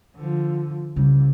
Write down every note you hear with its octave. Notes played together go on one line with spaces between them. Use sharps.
D3 F3
C2 C#3 G3